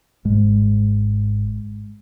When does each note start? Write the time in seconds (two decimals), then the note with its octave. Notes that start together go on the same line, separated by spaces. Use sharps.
0.25 G#1 G#2 G#3